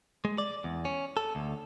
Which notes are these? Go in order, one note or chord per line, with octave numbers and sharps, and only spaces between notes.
G#3
D5
E2
C#4
A4
D2